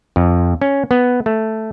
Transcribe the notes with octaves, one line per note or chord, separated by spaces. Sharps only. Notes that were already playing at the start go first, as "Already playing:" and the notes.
F2
C#4
B3
A3